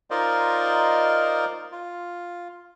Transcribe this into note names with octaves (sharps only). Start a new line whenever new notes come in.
D#4 F4 A#4 C5 D5 D#5
F4